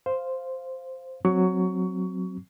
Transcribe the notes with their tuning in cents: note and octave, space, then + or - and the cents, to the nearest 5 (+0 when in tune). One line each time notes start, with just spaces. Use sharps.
C5 +0 F5 +0
F#3 +0 C4 +0 C#6 +20